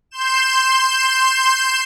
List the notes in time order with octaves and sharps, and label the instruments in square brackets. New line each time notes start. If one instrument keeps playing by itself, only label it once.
[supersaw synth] C6 G6 E7